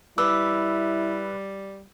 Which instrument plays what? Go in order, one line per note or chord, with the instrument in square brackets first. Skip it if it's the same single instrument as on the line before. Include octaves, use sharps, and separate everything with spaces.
[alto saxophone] G3 [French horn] E4 [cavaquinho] B4 [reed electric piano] D6 E6